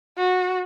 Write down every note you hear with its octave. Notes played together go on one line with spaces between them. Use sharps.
F#4